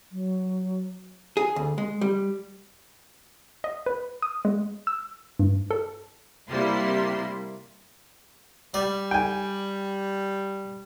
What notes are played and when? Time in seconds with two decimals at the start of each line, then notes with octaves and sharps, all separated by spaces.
0.12 F#3
1.37 G#4
1.56 D2
1.78 G#3
2.01 G3
3.64 D#5
3.86 B4
4.22 D#6
4.45 G#3
4.87 E6
5.40 G2
5.71 A4
6.50 C3 G3 A#3 E4 C6
8.74 G3 D5
9.11 G5 G#5